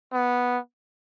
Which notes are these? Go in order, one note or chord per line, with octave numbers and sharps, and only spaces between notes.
B3